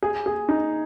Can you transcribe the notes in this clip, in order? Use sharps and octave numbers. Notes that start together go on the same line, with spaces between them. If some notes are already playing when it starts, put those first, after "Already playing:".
G#4
G#4
D#4